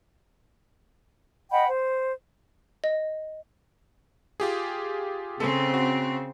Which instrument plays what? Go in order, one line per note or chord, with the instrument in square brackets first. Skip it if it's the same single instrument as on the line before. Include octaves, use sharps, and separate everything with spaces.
[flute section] D#5 F#5 G5 B5
C5
[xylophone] D#5
[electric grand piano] F4 G4 G#4
[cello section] C#3 C4 [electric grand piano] A4
[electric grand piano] F#4